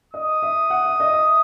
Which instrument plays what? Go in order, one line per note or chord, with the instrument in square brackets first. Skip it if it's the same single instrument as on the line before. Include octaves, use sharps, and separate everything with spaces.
[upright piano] D#5 [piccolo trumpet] D#6
[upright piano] E5
F#5
E5
D#5
E5